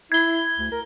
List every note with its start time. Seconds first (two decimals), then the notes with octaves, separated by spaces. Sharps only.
0.12 E4 G#6 G7
0.58 D2
0.72 A#4